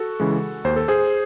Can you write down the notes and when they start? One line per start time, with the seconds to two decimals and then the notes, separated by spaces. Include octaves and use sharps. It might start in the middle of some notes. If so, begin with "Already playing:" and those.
Already playing: F#4 A4
0.20 C#3 E3 G#3
0.65 D#2 C5
0.76 A4
0.88 G#4 C5